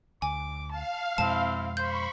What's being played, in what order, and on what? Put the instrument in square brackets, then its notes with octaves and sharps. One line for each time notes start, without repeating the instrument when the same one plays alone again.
[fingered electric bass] D2 [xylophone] G#5 [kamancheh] D6
[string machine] F5 [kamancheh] A5
[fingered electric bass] F2 B2 G#3 [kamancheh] C4 E4 [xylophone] A5
[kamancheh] C5 [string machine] B5 C#6 [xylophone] G6